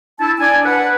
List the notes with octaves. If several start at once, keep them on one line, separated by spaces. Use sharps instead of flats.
D4 E4 A4 A5
D4 D5 G#5
B4 F#5